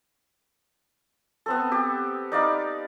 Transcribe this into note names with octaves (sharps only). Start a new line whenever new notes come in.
B3 C4 A4
G4
D#4 D5 F5 B5